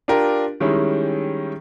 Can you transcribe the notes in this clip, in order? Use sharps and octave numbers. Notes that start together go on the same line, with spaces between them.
D4 F4 G4 A#4
D#3 G3 G#3 C#4 E4